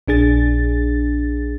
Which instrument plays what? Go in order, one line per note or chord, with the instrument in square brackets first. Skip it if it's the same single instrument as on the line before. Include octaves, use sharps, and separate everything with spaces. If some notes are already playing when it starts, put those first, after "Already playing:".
[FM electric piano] A#1 D4 G#4 A6